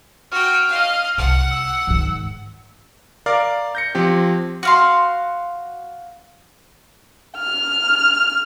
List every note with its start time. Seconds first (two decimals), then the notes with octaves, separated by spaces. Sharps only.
0.32 F#4 G5 F6
0.69 D#5 F5
1.18 C2 F#5
1.51 E6
1.87 G#2 D#3
3.26 A#4 D5 F5
3.75 G6 A#6 C#7
3.95 F3 C4 G4
4.63 F#4 F5 C6
7.38 F6